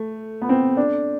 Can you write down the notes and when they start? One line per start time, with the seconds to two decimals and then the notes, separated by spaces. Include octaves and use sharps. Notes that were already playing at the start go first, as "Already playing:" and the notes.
Already playing: A3
0.42 B3
0.49 C4
0.77 D4